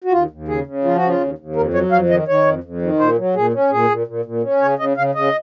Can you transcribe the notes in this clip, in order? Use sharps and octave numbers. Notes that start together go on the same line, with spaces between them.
F#4
D#2 F4
D#2
C#3 G#4
C#3
F3 F4
F#4
C#3
F4
D#2
D#2
F2 A#4
F#3 C#5
F2 F5
D#3 D#5
D#3 C#5
F2
F2
D#3
A#2 C5
F#3
A#2 G#4
C#4
A#2 G#4
A#2
A#2
A#2
C#4
C#3 C#5
C#3 D#5
C#3 F5
C#3 D#5